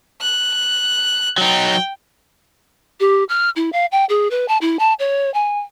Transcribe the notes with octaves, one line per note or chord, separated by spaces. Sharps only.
F#6
F#3 D#4 G5 G6
G4
F6
E4
F5
G5
G#4
B4
A5
E4
A5
C#5
G#5